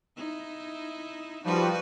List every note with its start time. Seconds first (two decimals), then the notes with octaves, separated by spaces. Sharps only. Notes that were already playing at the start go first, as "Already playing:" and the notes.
0.17 D#4 E4
1.44 F3 G3 D#4 F#4 B4